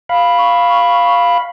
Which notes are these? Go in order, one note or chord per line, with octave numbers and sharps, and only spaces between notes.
F5 B5
C#6